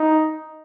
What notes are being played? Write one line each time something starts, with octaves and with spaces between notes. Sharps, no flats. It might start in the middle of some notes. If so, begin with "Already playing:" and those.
Already playing: D#4